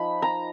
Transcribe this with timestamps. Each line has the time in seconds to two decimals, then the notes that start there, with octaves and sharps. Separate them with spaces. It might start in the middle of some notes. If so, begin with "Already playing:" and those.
Already playing: F3 D#4 B5
0.22 A#5